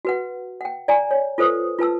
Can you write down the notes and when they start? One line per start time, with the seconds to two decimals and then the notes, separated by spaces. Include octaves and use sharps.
0.05 F#4 B4 F#5
0.61 F#5 G5
0.88 D5 G#5 A#5
1.11 C#5
1.38 F4 A4 B4 C5 D#6
1.79 F4 B4 A5 E6